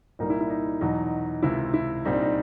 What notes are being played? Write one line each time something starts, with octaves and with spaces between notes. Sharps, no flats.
C2 A#2 G3 A#3 D#4
E4
E4
D#4
E2 B2 F#3 D#4
C#2 C3 D#3 E4
E4
C2 A#2 G3 C4 D#4
D4
D#4